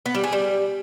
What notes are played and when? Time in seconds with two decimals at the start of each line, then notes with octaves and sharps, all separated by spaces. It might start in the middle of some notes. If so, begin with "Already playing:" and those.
0.06 B3
0.15 G3
0.24 G#4
0.33 G3